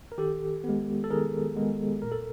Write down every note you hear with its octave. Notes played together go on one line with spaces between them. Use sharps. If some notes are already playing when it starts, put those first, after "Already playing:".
A#4
D#3 G4 A4
B3
G#3
A4
D#3 G#4 A#4
G#3 B3
A#2 A#4
A4